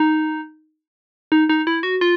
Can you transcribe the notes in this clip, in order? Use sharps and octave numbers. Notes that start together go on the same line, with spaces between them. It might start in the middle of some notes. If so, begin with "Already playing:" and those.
Already playing: D#4
D#4
D#4
E4
F#4
F4